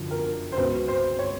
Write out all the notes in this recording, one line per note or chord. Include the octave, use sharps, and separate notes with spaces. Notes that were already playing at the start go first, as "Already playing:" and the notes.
Already playing: F#2 D3 F3
A#4
C5
C#2 B2 F#3 B4
C5
C#5